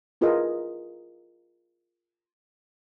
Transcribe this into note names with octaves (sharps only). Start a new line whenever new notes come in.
E4 F4 G#4 A#4 B4 D#5